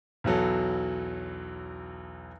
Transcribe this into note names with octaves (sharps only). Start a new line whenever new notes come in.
B1 E2 F#3 A4